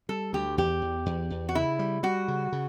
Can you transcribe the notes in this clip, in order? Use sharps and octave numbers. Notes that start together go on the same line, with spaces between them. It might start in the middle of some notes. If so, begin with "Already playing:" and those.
G3 A4
D2 G4
E2 G4
E2
E2
E2
F#4
C#3 E4
G3
G3 F#4
C#3
C#3